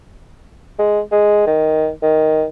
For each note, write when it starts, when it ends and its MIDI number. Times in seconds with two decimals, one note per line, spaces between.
0.79 1.00 56
1.12 1.45 56
1.47 1.89 51
2.02 2.45 51